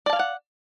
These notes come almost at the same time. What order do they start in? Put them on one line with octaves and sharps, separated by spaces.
D5 A5 F5 G#5 F#5